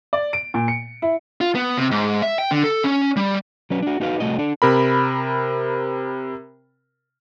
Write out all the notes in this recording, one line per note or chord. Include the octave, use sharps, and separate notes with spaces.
D5
D7
A#2
C#7
E4
F4
B3
C3
G#2
E5
G5
D3
A4
C#4
G3
F#3 C#4 B4
D4 F#4
D#4 F#4 B4 F5
C2 A3 F#4 D#5
D4 A4
C3 A#4 B5